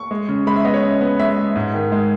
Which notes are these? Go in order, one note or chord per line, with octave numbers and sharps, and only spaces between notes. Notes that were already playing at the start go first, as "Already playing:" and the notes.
Already playing: C#6
G#3
C#3
G#3 B5
E5
B3 D#5
C#5
C#3
B3
G#3 E5
G#3
G#2
D#3
G#3